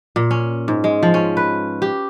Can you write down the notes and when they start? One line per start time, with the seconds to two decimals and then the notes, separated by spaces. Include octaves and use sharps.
0.16 A#2
0.31 C#4
0.68 G#2
0.84 G#3
1.03 F3
1.14 C#4
1.37 B4
1.82 G4